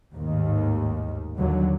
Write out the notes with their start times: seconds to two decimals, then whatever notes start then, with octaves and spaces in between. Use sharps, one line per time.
0.14 A1 D#2 G#2 D#3
1.38 D#2 D3 F#3 G3